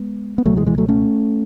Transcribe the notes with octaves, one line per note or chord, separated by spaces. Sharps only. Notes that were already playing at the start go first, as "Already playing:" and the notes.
Already playing: G#3 B3
B3
C#2 B2 F#3 A3
E3 G#3
E3 G#3
F#3 A3
A3 C#4